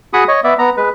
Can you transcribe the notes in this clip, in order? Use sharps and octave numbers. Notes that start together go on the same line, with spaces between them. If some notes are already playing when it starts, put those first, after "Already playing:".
F#4 G#4 B5 C#6 D#6
C#5 D#5
B3 D5 E5
B3 A#5
G#3 B4